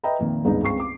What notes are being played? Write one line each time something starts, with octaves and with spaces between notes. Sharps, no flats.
B4 D#5 E5 G5 A#5 B5
F2 A#2 D#3
G1 C#2 G#2 D#4
C#2 C4 C#6 C7
D6